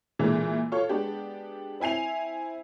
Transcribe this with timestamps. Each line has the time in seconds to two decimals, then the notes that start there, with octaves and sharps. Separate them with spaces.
0.19 A#2 D3 E3 G#3 E4
0.72 F4 A4 C#5 C#6
0.89 G#3 B3 D4 G4
1.80 C4 E4 G#5 C7 F7